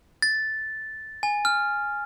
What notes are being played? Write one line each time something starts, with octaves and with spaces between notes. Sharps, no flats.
A6
G#5
F6